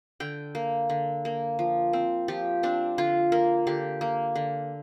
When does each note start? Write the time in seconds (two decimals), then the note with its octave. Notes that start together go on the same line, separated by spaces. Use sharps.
0.20 D3 G5
0.55 A#3
0.89 D3
1.25 A#3
1.59 F3
1.93 C4
2.28 F3 G4
2.63 C4 D4
2.98 D3 F4
3.32 A#3 A#4
3.67 D3 G4
4.01 A#3
4.35 D3